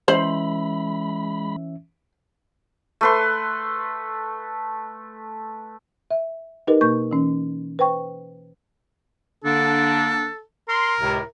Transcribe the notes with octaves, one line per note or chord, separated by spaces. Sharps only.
E3 G#3 C#4 C5 E5 B5
A3 B4 C6
E5
D#4 G4 A#4 B4 D#5
B2 A#3 C#6 G6
E3 C#4
B4 C5 G5 C#6
D3 A#3 D4 A4
A#4 C6
C#2 A2 C3